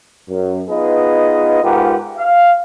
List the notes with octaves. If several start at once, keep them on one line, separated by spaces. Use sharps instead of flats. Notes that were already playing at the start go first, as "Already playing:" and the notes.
F#2
B3 D#4 F4 G#4 B4 D#5
G#2 F4 G4 A#4 B4 F#5
F5